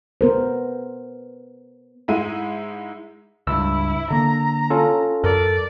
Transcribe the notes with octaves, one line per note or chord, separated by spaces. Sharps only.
B3 A#4 C5
G#2 G#3 E4 D#7
C#2 G2 E4 E6
D3 A#3 A#5
C#4 F4 A4
F#2 A4 A#4 D5